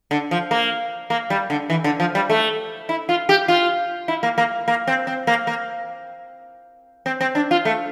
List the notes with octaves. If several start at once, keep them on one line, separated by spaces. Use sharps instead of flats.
D3
F3
A#3
A#3
G3
D3
E3
D3
F3
G3
A3
E4
F4
G4
F4
E4
A#3
A#3
A#3
C4
C4
A#3
A#3
C4
C4
D4
F4
A3